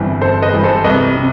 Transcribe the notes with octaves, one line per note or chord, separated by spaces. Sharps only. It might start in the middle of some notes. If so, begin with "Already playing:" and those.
Already playing: G1 G2 E3 C4 E4
G1 A4 C5
B4 D#5
G2 E3
A4 C5
C2 B4 D#5
C3